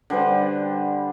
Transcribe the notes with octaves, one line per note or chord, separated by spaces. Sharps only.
D3 G3 B4 C5